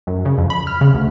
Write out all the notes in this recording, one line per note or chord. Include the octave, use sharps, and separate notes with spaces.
F#2
C#3
F2
B5
F6
C#3
D2